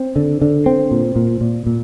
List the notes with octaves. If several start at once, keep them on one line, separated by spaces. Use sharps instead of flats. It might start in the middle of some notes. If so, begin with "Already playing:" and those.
Already playing: C4
D3
D3
C4
A#2
A#2
A#2
A#2